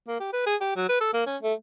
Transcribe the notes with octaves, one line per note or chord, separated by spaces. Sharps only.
A#3
G4
B4
G#4
G4
F#3
B4
A4
A#3
C#4
A3